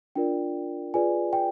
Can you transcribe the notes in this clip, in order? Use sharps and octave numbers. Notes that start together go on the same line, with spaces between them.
D4 F4 A#4 D5 G5
F4 G#4 B4 D5 G#5
G5